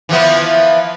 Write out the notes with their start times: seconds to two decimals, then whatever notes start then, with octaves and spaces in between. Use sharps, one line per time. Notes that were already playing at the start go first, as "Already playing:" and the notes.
0.09 E3 F3 B3